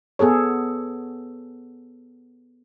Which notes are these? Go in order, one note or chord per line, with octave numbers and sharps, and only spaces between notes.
B3 G#4 A4 C#5